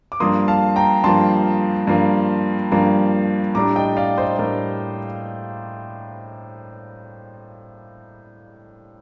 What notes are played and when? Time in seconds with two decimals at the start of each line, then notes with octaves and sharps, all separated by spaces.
0.12 D6
0.20 G2 F3 A#3 C6 D#6
0.48 F5 A5
0.76 G5 A#5
1.04 G2 F3 A#3 A5 C6
1.87 G2 F3 A#3
2.72 G2 F3 A#3
3.55 A2 G3 D4 A#5 D6
3.76 D#5 G5
3.97 D5 F5
4.18 C5 D#5
4.39 A2 G3 D4 A#4 D5